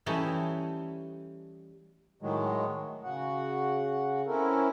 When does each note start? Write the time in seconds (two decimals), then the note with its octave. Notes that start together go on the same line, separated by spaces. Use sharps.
0.06 E3 G3 A3 C#4 D#4 E4
2.22 A2 D#3 F#3 G#3
3.04 C#3 F#4 F#5
4.27 C4 C#4 E4 A4 A#4